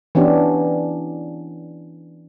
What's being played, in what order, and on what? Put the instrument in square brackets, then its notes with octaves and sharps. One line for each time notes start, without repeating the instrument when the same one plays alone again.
[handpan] E3 B3 C#4 D4 G4